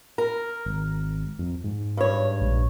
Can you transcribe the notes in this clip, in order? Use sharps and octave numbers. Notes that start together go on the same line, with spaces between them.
A#4
G#1
F2
G#2
G2 C#5
A#1